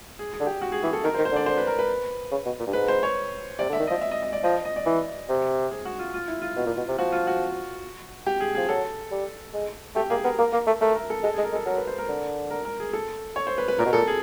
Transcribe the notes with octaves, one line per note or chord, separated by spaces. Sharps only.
G#4
G#4
D3
G4
F#4
G#4
E3 G#4
A4
D#3 A#4
C5
D#3
C5
D3 D5
C5
B4
A#4
B4
C#3
B2
A#2
G2
G#2 B4
C5
C#5
C3 D5
D3
E5
D#3
F3 D#5
E5
D#5
D#5
D5
F3 D#5
D#5
D5
E3
C3
G#4
F#4
F4
F4
E4
F4
B2
A#2
B2
C3
F3 F#4
F4
F#4
G4
G#4
F3 G#4
F#3 A4
G3
G#3
A3 G4
A#3 G#4
B3 A#4
A#3 A#4
A#3
A3
A3 A#4
A#4
A4
G#3 A4
G#3 G#4
A#4
G#3
A4
F#3 A#4
B4
C5
A#4
D3
A#4
A#4
G#4
A4
C#5
C5
B4
B4
A#2 A#4
B2
A#2 A4
G#4